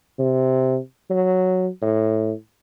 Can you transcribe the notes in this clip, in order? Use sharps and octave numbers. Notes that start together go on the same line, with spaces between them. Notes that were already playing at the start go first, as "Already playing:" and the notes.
C3
F#3
A2